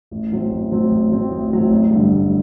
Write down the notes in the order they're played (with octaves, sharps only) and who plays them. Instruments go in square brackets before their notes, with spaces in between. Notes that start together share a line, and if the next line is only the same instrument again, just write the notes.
[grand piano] A1
A2 F#3 C4
A1
A2 F#3 C4
A1
A2 F#3 C4
A1
A2 F#3 C4
A1
G2 D3
A1